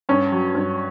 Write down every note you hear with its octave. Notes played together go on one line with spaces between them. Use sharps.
G2 C#4
F#3
G2